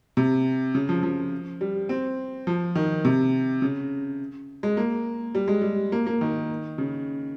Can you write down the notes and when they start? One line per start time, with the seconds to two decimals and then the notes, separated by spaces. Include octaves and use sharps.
0.17 C3
0.75 C#3
0.89 F3
1.03 F3
1.61 G3
1.89 C4
2.47 F3
2.75 D#3
3.05 C3
3.62 C#3
4.63 G#3
4.77 A#3
5.35 G3
5.48 G#3
5.61 G3
5.92 A#3
6.07 A#3
6.21 D#3
6.78 C#3